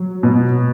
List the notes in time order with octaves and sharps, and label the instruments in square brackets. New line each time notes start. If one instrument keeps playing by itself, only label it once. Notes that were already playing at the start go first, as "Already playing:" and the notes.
Already playing: [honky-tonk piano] F#3
B2